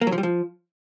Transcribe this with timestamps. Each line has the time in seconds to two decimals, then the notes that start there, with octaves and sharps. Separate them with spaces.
0.01 A#3
0.07 F#3
0.12 F3
0.18 G3
0.23 F3